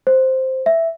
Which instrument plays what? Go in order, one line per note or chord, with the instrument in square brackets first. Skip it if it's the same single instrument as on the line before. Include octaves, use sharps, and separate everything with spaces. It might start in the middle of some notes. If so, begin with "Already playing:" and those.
[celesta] C5
E5